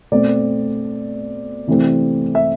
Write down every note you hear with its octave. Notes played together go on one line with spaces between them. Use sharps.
B2 A3 C4 D5
C3 E3 A3 C4
E5